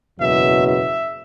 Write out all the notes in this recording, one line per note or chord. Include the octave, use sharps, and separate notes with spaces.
F#1 E2 B2 F#3 E5
E5